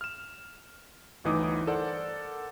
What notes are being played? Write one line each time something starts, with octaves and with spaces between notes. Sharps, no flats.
F6 E7
G1 D2 E3 D#4 D6 D#6
A4 A#4 C5 D5 F#5